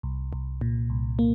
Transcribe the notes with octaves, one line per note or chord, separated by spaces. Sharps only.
C2
C2
A#2
C2
A#3